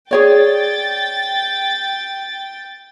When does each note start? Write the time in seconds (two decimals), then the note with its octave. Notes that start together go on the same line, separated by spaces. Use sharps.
0.11 G#4 C#5 D5 G5 A6